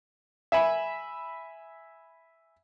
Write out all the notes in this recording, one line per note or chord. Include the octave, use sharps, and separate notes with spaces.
E5 G#5 B5